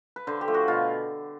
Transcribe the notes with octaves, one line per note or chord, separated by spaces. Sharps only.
B4
D3 C5
G4
F3 A3
F#4
B2 F4